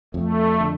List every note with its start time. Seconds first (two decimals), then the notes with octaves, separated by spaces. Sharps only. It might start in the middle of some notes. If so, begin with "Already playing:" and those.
0.14 F2 A3
0.60 D3